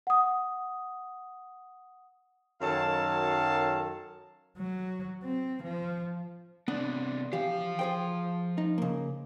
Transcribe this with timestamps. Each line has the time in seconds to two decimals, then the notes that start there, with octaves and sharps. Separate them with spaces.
0.07 F#5 D#6
2.62 F#2 D#3 F#3 A4 F5 A5
4.58 F#3
5.23 C4
5.63 F3
6.68 C3 B3 D4
7.33 E3 F3 G4 F5
7.79 G#4 C5 G5
8.58 D#4
8.78 C#3 A#3